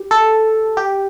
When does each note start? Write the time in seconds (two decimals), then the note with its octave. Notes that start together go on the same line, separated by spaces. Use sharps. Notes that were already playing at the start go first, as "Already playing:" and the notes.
Already playing: G4
0.11 A4
0.77 G4